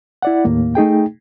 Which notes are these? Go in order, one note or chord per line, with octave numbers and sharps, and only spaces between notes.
E4 D5 F#5
D#2 A2 A#3
A3 D#4 G#4 G5